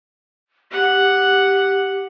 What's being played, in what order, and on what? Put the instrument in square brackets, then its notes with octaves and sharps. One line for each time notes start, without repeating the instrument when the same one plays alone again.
[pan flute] G4 [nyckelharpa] F#5